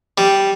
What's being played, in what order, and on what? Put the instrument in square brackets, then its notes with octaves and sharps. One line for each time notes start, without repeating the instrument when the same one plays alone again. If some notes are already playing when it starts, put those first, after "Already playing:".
[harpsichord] G3